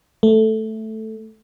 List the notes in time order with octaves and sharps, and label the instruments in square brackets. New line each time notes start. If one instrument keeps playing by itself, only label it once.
[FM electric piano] A3